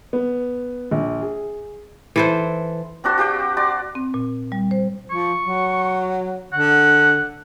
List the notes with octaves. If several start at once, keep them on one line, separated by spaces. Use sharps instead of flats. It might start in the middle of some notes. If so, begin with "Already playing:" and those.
B3
A#1
G#4
E3 A4 C5
C4 D4 F#4 C5
F#4 G4 C5 G5
F#4 D5 C6
C4
A#2
G3
C5
F3 C#6
F#3
D3 F#5